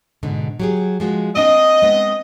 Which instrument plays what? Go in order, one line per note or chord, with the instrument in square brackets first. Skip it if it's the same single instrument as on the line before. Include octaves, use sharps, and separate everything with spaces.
[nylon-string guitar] G#2 B2 D3
F#3 G4 G#4
F3 G#3 F#4
[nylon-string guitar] A#3 C4 D4 [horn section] D#5
[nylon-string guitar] G#3 B3 C4